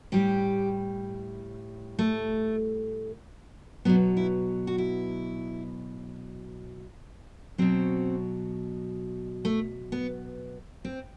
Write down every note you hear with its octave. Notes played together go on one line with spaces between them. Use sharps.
A2 G3 G4
A3
B2 F#3 B3
E4
F#4
E4
B2 F#3 C4
A3
B3
C4